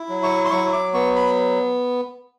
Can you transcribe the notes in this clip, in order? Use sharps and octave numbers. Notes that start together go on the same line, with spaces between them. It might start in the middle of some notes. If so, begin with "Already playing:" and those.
Already playing: E4
F#3
C#6
C6
F#3 C#6
D6
B3 C#6
B5